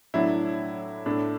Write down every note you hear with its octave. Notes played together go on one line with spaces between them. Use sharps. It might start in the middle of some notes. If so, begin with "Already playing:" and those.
A2 F#3 D4 E4
A2 A3 D4